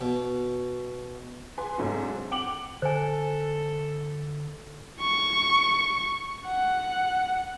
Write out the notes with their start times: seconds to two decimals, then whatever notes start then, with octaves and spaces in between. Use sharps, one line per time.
0.01 B2
1.58 G#4 B4 G#5 C6
1.78 G#2 C3 F#3 A3 D4 F#4
2.15 C4
2.31 F#5 G5 D6 F7 F#7
2.82 D3 A4 C5 G#5
5.01 C#6
6.47 F#5